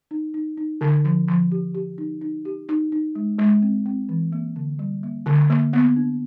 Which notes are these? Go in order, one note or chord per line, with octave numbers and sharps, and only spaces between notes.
D#4
D#4
D#4
D3
F3
F3
G4
G4
D#4
D#4
G4
D#4
D#4
G#3
G#3
C4
C4
E3
A#3
D3
G3
A#3
D3
A#3
B3
D4